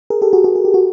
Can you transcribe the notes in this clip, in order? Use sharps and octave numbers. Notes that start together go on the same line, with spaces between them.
G#4 A#4
G4 A4
F#4 G#4
F#4 G#4
G#4
G4
F#4